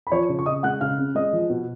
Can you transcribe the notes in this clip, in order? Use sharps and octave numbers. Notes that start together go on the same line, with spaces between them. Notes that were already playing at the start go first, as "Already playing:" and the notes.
B5
F3 C#5 C#6
C#3
C#6
C#3 D#5 D#6
G#3 F#5 F#6
C#3 F5 F6
C#4
G#3 D#5 D#6
F3
B2